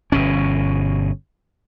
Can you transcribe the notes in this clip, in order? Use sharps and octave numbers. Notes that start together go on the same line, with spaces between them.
G1 B2 C#4